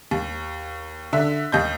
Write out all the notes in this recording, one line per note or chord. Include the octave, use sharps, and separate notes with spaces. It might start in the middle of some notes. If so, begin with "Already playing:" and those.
D#2
D3 E5
D#2 D#5 G6